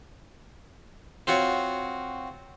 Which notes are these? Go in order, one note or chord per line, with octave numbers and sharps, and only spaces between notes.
C4 F4 F#4 C#5